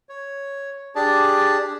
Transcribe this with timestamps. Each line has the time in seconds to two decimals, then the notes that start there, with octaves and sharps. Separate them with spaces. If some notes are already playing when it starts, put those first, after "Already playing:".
0.09 C#5
0.95 D4 G4 G#4 D5 A5